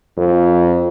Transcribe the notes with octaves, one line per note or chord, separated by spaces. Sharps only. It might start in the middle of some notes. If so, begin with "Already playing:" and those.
F2